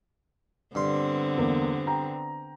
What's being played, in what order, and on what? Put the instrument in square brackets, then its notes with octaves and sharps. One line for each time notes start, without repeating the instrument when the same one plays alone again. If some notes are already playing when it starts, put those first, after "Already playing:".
[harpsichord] G2 C6 [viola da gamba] D3 B3 C4
[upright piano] E2 A#3
G5 A#5